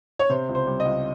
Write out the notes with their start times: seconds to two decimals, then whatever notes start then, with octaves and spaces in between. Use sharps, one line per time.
0.19 C#5
0.30 C3 C5
0.49 C#2
0.55 C5
0.67 G3
0.80 D#5
0.85 C#2